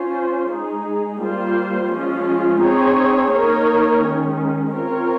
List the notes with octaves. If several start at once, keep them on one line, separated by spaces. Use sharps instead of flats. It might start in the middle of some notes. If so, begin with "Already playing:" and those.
Already playing: C#4 F4 C5
G#3 D#4 G#4
G3 A#3 F4 C5
F3 G#3 C#4 F4
C4 D#4 G#4 C#5
A#3 D#4 A#4 C#5
D#3 G#3 C#4
C4 F4 A#4 C#5